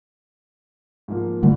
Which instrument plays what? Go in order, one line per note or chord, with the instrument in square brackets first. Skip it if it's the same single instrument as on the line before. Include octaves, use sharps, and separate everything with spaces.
[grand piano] G#2 F3 A#3
[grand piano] G1 C2 F#5 [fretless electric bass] D3 G3 A3